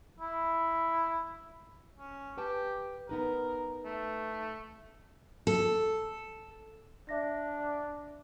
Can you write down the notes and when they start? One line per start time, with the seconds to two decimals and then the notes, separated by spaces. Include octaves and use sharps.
0.20 E4
1.97 C#4
2.38 G4 B4 G5 A5
3.09 B3 D#4 A#4 B4
3.85 A3
5.47 A4
7.09 D4 D5 E5 A#6